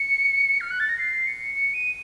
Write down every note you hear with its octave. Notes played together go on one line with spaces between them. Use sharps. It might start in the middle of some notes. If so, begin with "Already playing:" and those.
Already playing: C#7
F6
F#6
A6
A#6
C7
C#7
C#7
D#7